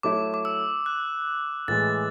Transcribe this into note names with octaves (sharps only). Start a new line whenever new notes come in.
F#3 A3 E4 D6
D6
E6
F#6
A2 E3 G#3 A6